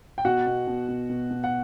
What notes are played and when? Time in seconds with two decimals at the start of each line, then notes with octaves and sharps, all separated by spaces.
0.18 G5
0.25 B2 F#4 F#5
0.47 B2
0.67 B2
0.88 B2
1.09 B2
1.30 B2
1.44 F#5